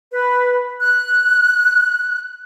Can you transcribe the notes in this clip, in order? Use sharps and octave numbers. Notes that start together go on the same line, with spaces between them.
B4
F#6